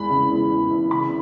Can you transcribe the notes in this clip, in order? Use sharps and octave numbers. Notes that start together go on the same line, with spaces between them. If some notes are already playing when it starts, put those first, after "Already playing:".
Already playing: E2 G#3 B5
C#3
E2
E2
E2
C#3 B5